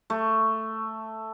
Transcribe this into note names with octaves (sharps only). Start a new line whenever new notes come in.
A3